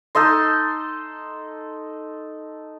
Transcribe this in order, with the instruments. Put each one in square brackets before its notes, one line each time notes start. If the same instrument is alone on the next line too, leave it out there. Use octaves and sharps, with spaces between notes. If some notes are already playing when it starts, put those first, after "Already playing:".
[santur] D#4 A4 D#5 C6